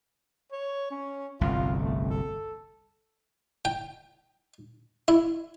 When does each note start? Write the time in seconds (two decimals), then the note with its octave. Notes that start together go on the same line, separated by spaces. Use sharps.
0.52 C#5
0.91 C#4
1.41 G1 C2 F2 F4
1.80 A3
2.10 A4
3.65 G5
5.08 E4